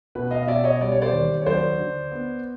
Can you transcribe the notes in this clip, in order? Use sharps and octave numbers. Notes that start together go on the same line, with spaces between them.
B2 B4
D#5 F5
B2 D5 E5
C#5 D#5
G3 D5
C#5
C5 D5
D#2
C#5
F#3 C5 D5
D3
B3